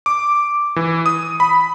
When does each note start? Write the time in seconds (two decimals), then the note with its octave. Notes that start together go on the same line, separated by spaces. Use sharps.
0.06 D6
0.76 E3
1.06 D#6
1.40 B5